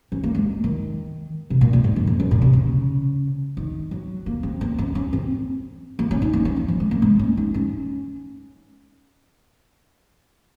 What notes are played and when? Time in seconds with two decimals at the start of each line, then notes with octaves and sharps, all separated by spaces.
0.12 C#4
0.23 A#3
0.35 G#3
0.64 D#3
1.50 C3
1.61 A#2
1.73 A#2
1.84 G#2
1.96 F#2
2.07 F2
2.20 F#2
2.31 A#2
2.41 C3
2.53 C#3
3.57 D#3
3.91 F#3
4.26 A#3
4.43 C4
4.61 C4
4.78 C#4
4.95 C#4
5.13 C4
5.99 A#3
6.11 C#4
6.22 D#4
6.33 C#4
6.45 C#4
6.56 A#3
6.68 F3
6.80 G#3
6.91 A#3
7.02 G#3
7.19 C#4
7.37 D#4
7.54 C#4